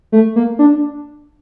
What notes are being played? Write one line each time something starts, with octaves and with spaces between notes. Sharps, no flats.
A3
A#3
D4